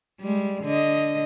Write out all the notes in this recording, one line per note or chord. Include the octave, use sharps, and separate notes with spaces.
G3 G#3
D3 D#5